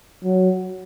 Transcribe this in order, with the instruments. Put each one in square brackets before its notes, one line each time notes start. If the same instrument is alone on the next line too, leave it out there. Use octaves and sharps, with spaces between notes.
[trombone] F#3